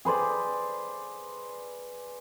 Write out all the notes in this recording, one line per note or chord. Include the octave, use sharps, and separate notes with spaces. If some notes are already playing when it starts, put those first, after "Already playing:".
G#4 B4 C5 D5